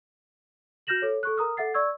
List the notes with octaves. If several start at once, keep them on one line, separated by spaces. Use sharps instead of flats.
F#4 F6 G6 A#6 E7 F#7
A4 C#5
A4 C#6 F#6
A#4 A#5 D#6 F6
A4 E5 F#5 A6 C7
D5 C#6 E6 G#6